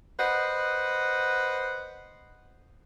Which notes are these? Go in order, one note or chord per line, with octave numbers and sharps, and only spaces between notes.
B4 C5 D#5 F#5